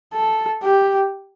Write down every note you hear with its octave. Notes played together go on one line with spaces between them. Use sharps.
A4
G4